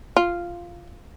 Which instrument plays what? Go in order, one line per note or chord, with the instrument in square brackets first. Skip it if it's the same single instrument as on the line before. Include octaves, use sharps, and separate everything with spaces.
[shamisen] F4